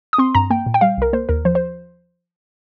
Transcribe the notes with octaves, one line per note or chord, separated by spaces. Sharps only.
D#6
C4 C6
G2 A#5
A#3 G5
A#2
G5
G3 F5
C2 A#4
A#3 C5
D#2 A#4
F3 C5
C5